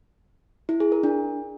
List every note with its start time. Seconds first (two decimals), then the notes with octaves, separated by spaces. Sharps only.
0.69 E4
0.80 G#4
0.92 A#4
1.03 D4